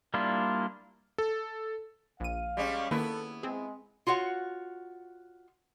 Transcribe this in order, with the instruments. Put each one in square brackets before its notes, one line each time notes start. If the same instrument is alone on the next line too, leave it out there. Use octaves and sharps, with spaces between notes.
[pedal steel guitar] G3 A#3 D4 E4 F4
[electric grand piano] A4
[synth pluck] A#1 D#7 [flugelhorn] F5
[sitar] G3 G#3 C#4
[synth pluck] D#3 A#3 [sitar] B3 E4 [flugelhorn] A4
[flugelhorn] G#3 [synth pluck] C4 G#4
[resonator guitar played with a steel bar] F4 F#4 C#5 F#5